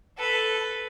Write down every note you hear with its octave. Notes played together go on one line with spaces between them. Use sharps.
A4 B4